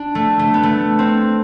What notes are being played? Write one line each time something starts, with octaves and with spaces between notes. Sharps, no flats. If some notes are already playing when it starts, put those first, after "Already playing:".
Already playing: D4
A3
A3
B3
A3
C4